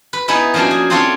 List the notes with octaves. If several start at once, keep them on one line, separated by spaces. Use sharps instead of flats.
B4
B3 D#4 E4 G#4 B4
F3 A#3 C#4 D4 F#4
G#4
C4 D4 F4 F#4 A4 C#5